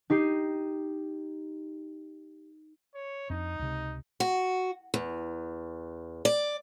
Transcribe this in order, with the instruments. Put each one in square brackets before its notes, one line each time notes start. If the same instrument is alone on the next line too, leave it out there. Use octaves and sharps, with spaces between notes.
[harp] D#4 G4 C7
[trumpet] C#5
[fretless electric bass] F2 D4 [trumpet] D#4
[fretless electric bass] C#2 C3
[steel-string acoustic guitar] F#4
E2
D5